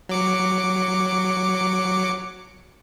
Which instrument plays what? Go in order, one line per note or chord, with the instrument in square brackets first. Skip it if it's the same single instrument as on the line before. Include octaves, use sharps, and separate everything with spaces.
[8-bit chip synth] F#3 D6 C#7